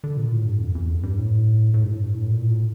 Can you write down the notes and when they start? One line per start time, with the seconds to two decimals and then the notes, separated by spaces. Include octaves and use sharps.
0.04 D3
0.17 A#2
0.32 A2
0.46 G2
0.60 F2
0.75 E2
0.89 F2
1.03 G2
1.17 A2
1.74 A2
1.83 G2
1.88 A2
2.02 G2
2.16 A2
2.31 A#2
2.49 A2